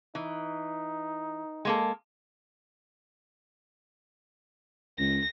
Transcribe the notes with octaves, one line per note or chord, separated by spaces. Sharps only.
E3 D#4
G#3 A#3 A4
C#2 A#6